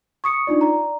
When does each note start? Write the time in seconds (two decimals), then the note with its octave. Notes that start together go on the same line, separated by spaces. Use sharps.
0.24 C#6 D#6 C#7
0.47 D4 D#4 F4 D5
0.61 D5 A#5